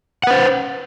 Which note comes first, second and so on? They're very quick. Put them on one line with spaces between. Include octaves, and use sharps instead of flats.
F#5 B4 C5